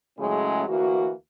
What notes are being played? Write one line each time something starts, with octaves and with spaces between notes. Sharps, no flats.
A2 C#3 F#3 G#3 A3 C#4
D2 E3 A#3 F#4